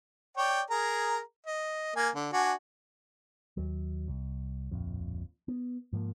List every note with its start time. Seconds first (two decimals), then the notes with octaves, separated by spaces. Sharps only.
0.37 C#5 D5 G5
0.70 G#4 A#4 A#5
1.46 D#5
1.96 A#3 G#5
2.15 D3
2.33 D4 F#4 G#5
3.57 D#2 F#3
4.08 C2
4.72 D1 A#1 F2
5.48 B3
5.93 G#2 F3 F#3 A#3